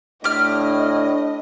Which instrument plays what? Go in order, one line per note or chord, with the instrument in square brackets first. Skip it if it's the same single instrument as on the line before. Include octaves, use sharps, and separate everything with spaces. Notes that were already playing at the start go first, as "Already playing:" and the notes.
[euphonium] A2 [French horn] D4 [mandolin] G4 F6 [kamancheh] D#5